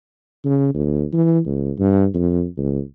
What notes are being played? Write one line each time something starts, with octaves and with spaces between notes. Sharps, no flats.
C#3
D2
E3
C#2
G2
F2
C#2